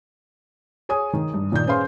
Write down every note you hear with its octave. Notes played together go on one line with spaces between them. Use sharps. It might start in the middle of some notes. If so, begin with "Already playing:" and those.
G#4 C#5 G#5 D#6
D#3
G2
A#2 D#3 D5 G6
C#4 G#4 B4 C5 F5 C6